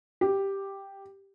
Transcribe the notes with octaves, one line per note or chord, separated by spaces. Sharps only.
G4